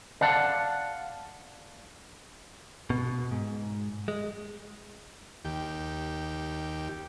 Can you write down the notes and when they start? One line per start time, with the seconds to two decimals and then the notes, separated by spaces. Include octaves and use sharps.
0.21 D5 F5 F#5 A5
2.90 B2
3.31 G#2
4.08 G#3
5.45 D#2 G4